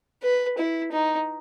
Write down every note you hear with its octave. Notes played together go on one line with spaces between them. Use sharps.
B4
E4
D#4